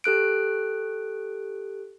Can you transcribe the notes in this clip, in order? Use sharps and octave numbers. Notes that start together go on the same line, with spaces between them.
G4 A4 F#6 D7